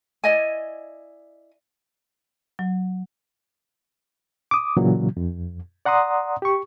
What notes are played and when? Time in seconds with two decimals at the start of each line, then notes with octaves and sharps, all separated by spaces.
0.24 E4 D5 D#5 G#5
2.59 F#3
4.51 D6 D#6
4.77 A#2 C#3 E3 F#3
5.17 F2
5.85 D5 F#5 A#5 C6 D#6
6.42 G4 C#6